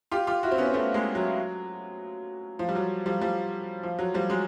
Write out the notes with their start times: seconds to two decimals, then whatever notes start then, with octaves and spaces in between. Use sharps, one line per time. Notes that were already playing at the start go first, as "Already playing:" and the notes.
0.12 F4 G4
0.27 F4 G4
0.43 E4 F#4
0.51 C4
0.58 B3 C#4
0.67 C4
0.74 A3 B3
0.94 G#3 A#3
1.15 F#3
2.59 F3
2.69 G3
2.75 F#3
3.06 F3 G3
3.21 F3 G3
3.83 F3
3.99 F#3
4.14 F3 G3
4.30 F#3 G#3